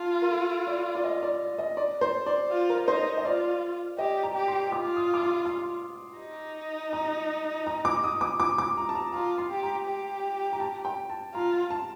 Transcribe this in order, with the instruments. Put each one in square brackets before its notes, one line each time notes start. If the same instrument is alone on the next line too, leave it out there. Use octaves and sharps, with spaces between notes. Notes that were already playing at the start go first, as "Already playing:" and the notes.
Already playing: [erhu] F4 [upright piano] A5
[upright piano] A#4
A4
D5
D5
D#5
D5
D#5
D5
C5
D5
[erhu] F4
[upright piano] A#4
[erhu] D#4 [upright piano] C5
[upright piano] D#5
[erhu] F4 [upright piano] D5
[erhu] G4 [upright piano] D#5
[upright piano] A#5
[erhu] G4
[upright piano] C6
[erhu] F4 [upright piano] D6
[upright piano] D#6
D6
C6
C6
[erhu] D#4
[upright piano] A#5
A#5
D6
D#6
D6
D6
D6
A#5
A5
A#5
[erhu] F4 [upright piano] A#5
[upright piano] C6
[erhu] G4
[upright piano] A#5
[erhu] G4
[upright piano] A#5
A5
G5
A5
[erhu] F4 [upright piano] A#5
[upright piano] A5